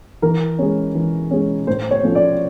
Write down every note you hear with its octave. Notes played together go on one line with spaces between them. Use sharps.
E3 A#4
G#3 C#4
E3
G#3 C#4
A2 C5
C#5
F3 A3 C#4
D5